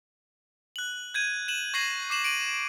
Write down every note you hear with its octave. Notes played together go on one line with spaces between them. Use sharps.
F#6 F#7
G6 G#6 D#7
D#7 E7 F#7
C#6 G#6 A#6 C7 D#7 F#7
D6 C7 E7 F#7
D7 D#7 F#7